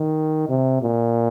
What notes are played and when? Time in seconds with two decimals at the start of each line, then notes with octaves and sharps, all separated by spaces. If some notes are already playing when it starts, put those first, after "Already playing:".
Already playing: D#3
0.48 C3
0.82 A#2